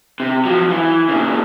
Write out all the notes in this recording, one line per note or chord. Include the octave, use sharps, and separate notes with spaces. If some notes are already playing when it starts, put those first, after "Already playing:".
C3
F3 F#3
E3
A#2 C#3